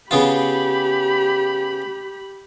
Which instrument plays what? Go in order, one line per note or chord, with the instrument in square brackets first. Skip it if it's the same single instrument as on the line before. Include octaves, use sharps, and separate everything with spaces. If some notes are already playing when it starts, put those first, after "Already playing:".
[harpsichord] C#3 B3 F4 [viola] G4 B5